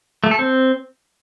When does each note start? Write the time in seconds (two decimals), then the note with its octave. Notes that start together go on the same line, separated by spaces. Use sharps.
0.24 A3
0.31 A4
0.39 C4